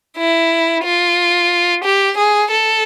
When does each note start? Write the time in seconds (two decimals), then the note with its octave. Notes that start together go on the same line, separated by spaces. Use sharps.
0.17 E4
0.84 F4
1.84 G4
2.17 G#4
2.51 A4